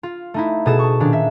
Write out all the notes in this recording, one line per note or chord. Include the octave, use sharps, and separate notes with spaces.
F4
A3 D#4 E4
B2 G#4 A4 D#6 E7
A5 C#6
A#2 D#3 C#4 D4
E5